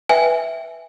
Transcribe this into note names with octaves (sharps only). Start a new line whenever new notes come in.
B4 E5 G5 G#5